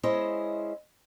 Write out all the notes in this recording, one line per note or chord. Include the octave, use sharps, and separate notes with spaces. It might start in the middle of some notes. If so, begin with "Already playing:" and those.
G#3 C#4 E4 C5 D#5